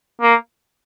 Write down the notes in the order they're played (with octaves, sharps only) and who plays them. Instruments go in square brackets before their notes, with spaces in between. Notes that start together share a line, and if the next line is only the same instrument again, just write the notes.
[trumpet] A#3